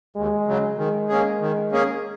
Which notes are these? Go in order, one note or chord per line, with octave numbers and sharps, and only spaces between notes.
D#2 G#3
C#3 F#3
D#3 G#3
A#3 C#4 G#4
D#3
A#3 C#4 G#4